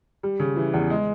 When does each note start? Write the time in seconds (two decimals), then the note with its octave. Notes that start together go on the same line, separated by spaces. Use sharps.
0.23 G3
0.39 C#3
0.56 E3
0.73 E2
0.90 G#3